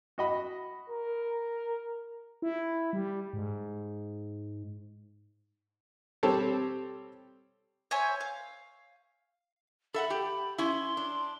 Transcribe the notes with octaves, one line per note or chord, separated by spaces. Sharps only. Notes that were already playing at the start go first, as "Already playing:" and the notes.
F#4 D#5 B5
A#4
E4
G3
G#2
G3 C4 G4 A4 C#5
C5 C#5 E5 G#5
F5
A4 E5 F#5 B5
G4
C#4 E4 C6
D4